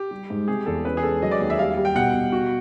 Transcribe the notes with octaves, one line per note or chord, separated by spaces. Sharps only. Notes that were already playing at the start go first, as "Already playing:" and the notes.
Already playing: G4
G3
G#2
C3 G#4
E2 A4
C#4 B4
G#4
G#3 A4
F#3 D#5
D5
D#2
E5
G3 F5
G3
G5
B2 F#5
B2
F#4